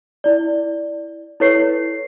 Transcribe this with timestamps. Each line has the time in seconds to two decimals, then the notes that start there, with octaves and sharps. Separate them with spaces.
0.24 E4 D5
1.40 E4 A4 B4 C#5 C#6 C7